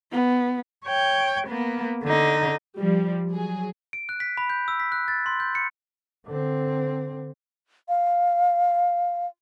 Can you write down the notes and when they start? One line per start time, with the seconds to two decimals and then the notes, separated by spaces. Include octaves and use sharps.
0.12 B3
0.85 C#5 G5
1.48 A#3 B3
2.04 D3 D#4
2.77 F3 G3
3.30 F#3 G#4
3.93 D7
4.09 F#6
4.20 B6
4.37 B5
4.50 G6
4.68 E6
4.80 B6
4.92 F#6
5.08 A6
5.26 C6
5.40 G6
5.55 C#7
6.26 D3 C4
7.89 F5